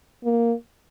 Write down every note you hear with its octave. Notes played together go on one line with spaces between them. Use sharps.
A#3